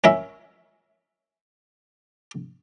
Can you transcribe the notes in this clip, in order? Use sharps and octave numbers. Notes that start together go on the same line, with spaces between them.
C#4 A#4 E5